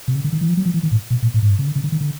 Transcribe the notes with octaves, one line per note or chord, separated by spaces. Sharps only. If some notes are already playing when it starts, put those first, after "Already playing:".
C3
C#3
D3
D#3
E3
F3
F#3
F3
E3
D#3
A2
B2
A#2
A2
G#2
G2
C#3
D3
C#3
D3
D#3
D3